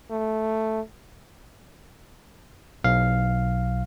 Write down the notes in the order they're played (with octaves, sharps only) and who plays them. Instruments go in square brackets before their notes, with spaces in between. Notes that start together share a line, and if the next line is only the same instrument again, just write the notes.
[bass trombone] A3
[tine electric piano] B1 F5